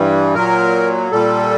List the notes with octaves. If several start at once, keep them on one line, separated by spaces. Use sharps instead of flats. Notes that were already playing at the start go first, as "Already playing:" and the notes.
Already playing: G2 E3 G3
A#2 F#3 A#4
A#2 G3 A4